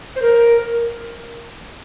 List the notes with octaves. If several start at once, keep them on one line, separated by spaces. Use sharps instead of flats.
C5
A#4